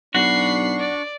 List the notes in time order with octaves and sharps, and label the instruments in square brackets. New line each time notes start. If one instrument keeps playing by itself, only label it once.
[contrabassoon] B1 [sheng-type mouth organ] D4 C#6 [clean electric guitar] F#4 [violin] B5 C7
[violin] D5